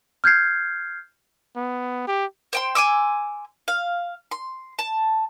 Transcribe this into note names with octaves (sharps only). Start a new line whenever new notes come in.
F6 G6 G#6 C7
B3
G4
C5 G5 C6
G#5 C6 D6 E6
F5
C6
A5